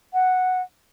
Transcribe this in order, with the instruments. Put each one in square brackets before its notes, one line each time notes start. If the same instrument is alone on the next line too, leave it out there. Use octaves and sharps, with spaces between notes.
[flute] F#5